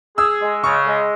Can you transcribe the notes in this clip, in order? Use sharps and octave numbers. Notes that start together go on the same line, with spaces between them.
G#4 E6
G#3
C#3 C#6
G#3